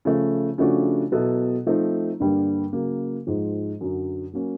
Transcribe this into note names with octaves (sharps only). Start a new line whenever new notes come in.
C#3 F3 A3
C#3 F3 A3 D4 F#4
B2 F#3 B3 E4 A4
F3 A3 C4 D#4
G2 D3 G3 A#3 D4
C#3 F#3 A#3
G#2 F3 G#3
F#2 D3 F#3
F#3 A#3 C#4